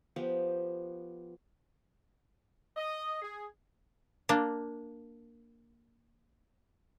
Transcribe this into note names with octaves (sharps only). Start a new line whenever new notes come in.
F3 B3 G4
D#5
G#4
A#3 D4